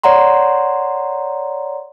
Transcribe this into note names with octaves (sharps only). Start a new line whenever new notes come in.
C#5 D5 F#5 A#5 C6